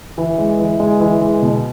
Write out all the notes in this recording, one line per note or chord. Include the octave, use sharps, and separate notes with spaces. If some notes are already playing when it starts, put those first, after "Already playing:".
E3
G#3
E3
G#3
E3
G#3
B2